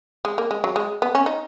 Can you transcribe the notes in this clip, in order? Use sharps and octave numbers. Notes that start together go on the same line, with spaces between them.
G#3
A#3
G#3
F#3
G#3
B3
C#4
D#4